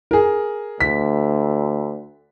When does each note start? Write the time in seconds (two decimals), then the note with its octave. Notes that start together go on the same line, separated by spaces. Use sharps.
0.11 G#4 A#4
0.80 D2 B6